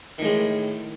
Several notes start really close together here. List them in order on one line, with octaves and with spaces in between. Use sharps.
D#3 A2 G#3